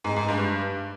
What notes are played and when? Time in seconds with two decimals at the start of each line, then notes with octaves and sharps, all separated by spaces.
0.04 G#2
0.16 G#2
0.28 G2